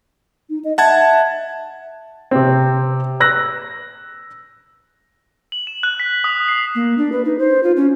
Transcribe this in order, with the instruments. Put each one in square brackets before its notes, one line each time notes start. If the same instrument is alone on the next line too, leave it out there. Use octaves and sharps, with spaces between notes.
[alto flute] D#4
D#5
[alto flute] E5 [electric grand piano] F#5 A5 G#6
[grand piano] C3 C4
E6 F#6 A#6
[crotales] F#7
E7
F#6
B6
D#6
C7
[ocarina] A#3
D4
B4
D#4
C5
F4
C#4